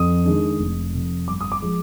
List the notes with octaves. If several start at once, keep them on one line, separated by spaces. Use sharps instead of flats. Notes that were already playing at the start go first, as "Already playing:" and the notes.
Already playing: F2 D#6
D#3 G#3 D4
F1
F2 C3
G1 D6
D#6
D6
F3 G#3